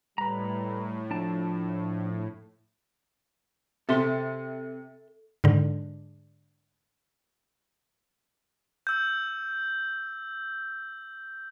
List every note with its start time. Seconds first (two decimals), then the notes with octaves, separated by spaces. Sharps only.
0.18 A2 G3 B4 A#5
1.11 F3 D4 A5
3.89 C3 A4 E5 C6
5.44 G#2 D3
8.87 E6 G6